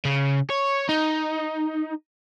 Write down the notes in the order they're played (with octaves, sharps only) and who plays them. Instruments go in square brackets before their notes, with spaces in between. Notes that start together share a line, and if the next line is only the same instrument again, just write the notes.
[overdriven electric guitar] C#3
C#5
D#4